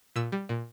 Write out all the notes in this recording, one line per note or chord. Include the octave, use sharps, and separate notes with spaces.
A#2 E6
G3
A#2